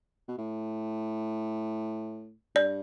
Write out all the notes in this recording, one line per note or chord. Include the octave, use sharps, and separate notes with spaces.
B2
A2
G2 D5